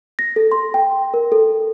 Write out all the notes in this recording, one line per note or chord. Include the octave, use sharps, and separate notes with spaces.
A#6
A4
C6
G5
A#4
A4